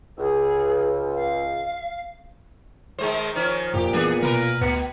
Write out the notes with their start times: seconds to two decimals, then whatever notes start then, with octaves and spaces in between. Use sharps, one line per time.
0.18 C#2 G#4
1.15 F5
2.98 D#3 G#3 C5
3.35 D#3 F3 C#4
3.74 F2 A#2 G4
3.93 E3 B3 D4 G#4
4.22 B2 A#4 B4
4.61 D2 B2 B3